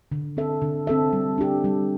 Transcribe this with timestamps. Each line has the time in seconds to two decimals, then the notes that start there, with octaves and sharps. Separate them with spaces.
0.12 D3
0.37 C4 A4 E5
0.62 D3
0.87 C4 A4 E5
1.13 G3
1.38 D4 G4
1.64 G3